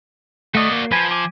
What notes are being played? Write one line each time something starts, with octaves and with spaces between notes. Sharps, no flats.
A3 F#4 D5 D#5
A#3
F3 B4 G#5
G#5 D6